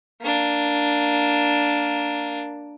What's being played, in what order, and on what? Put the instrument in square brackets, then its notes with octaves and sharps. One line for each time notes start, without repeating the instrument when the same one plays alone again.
[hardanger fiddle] A#3 D4